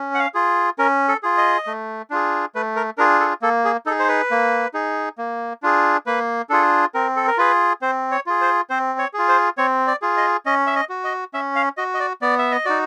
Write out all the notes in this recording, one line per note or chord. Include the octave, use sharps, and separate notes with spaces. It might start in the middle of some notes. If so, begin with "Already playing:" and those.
Already playing: C#4
F#5
F5
F4 G#4
C#4 A#4
A4
F4 G#4
D#5
A3
D4 F4 G#4
A3 B4
A#4
D4 F4 G#4 A#4
A4
A#3 A4
G#4
D#4 G#4 A4
C5
B4
A#3
D#4 G#4
A#3
D4 F4 G#4
A#3 B4
D4 F4 G#4 A4
C4 A#4
A4
A#4
F4 G#4 B4
C4 C5
C#5
F4 G#4
C5
C4 C5
C#5
F4 G#4
C5
C4 C#5
D5
F4 G#4
D#5
C#4 D#5
E5
D#5
F#4
D#5
C#4 E5
F5
F#4 D#5
D#5
D5
B3 D5
E5
D#5
D#4 F#4 D5